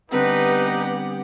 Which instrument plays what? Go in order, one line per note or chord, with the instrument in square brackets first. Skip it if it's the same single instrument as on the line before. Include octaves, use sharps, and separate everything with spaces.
[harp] D3 G3 C4 [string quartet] B3 G4 F#5 [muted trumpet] D#4 [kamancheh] B4